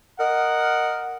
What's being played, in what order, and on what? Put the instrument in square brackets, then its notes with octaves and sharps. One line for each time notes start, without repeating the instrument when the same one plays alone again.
[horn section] A#4 D#5 F#5